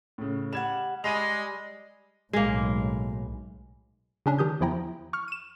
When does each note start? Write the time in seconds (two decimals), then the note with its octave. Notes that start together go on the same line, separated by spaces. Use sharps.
0.18 A2 C#3
0.53 G3 F#5 G#6 E7
1.04 G3 G#3 D#5 D#7 F7
2.33 B1 A2 G#3 A#3
4.26 C#3 C#4 D4
4.38 D#3 G4 D#6 G6
4.60 E2 F3 E4 G5 A#5
5.13 C#6 F6
5.28 D#7 E7